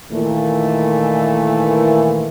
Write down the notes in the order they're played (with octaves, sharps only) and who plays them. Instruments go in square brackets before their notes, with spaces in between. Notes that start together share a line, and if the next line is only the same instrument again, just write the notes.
[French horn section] A#2 D#3 E3 [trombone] A3